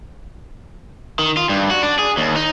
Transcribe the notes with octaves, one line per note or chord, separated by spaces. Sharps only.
D#3
F4
G2
F#4
D4
G#4
D#2
D#4